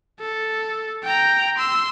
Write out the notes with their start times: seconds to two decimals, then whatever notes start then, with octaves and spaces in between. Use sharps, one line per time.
0.20 A4
1.04 G5 A#5
1.57 C6 E6